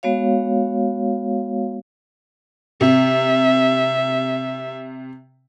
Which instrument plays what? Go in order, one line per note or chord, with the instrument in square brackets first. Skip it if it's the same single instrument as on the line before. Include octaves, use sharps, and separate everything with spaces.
[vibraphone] G#3 B3 F#4 C#5 F5
[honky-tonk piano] C3 [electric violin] E5